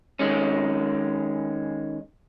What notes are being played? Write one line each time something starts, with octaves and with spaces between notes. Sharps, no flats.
D#3 G#3 C#4